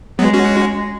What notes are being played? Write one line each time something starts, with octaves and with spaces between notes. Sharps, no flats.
F#3 G#3 B3
C#4 F#4